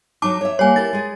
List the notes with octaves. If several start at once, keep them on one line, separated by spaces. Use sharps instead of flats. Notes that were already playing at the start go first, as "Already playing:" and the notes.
F#3 D#4 A5 D6
C#5 E5
G3 A3 A#3 C#5 G#5
E4 G4 A#4 A6
G#3 G#4